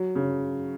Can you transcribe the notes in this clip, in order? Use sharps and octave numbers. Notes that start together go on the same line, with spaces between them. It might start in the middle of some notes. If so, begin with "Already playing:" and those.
Already playing: F#3
C#3